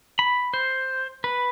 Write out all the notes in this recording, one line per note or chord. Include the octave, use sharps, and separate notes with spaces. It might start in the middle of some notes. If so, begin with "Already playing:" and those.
B5
C5
B4